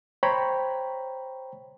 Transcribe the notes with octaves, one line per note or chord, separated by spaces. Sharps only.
C5 C#5 G5 A#5 B5